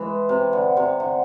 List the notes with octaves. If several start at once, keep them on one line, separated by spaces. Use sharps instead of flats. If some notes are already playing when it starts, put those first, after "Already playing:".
Already playing: E3 G#3
C3
D3
C3
D3